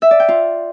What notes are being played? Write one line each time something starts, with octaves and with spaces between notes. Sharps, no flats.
E5
D5
G5
F4